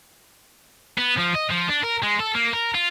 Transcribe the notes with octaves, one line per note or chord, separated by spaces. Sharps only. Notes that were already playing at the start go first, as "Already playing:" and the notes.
B3
F3
D#5
F3
D4
A#4
G#3
A4
A#3
A#4
F4